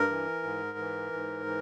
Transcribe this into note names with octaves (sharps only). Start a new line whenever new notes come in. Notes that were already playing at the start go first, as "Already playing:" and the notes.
Already playing: G2 A#4
E3
G#2
E3
G#2
E3